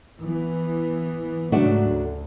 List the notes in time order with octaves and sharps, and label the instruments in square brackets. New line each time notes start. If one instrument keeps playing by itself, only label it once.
[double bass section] E3 B3
[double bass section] G#2 C#3 F#3 [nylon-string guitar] A3 D4 F#4
[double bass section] D2